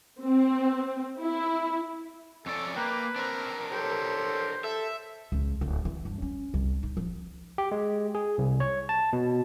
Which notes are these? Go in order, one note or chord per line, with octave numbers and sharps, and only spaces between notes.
C4
E4
F2 C#4 A4 D5
A#3 B4 G5 A#5 D6
C4 D4 A#4
G4 A4 C5 C#5
A4 E5
C#2
D1
E3
G2
C#4
C2
D#4
F3
G4
G#3
G#4
C2
C#5
A5
B2